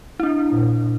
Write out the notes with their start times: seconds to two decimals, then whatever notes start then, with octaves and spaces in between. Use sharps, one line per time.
0.20 D4 E4
0.49 A#2